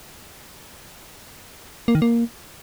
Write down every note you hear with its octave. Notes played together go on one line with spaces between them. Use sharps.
A#3
D#3
A#3